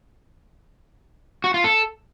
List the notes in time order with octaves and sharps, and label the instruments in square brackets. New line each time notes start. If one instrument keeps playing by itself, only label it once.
[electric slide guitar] F#4
F4
A4